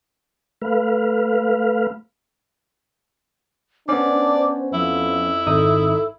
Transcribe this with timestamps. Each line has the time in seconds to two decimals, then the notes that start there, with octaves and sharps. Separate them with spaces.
0.62 A3 B4 F5
3.89 B3 C#4 D4 C5 D5
4.73 F2 F3 E4
5.47 G#1 D#4 A4 D#6